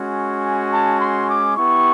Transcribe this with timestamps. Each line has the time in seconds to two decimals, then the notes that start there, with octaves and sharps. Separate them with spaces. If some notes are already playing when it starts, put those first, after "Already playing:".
Already playing: G#3 C#4 F#4
0.42 G#5
0.71 A5
1.00 C6
1.28 D6
1.57 B3 E4 G4 C#6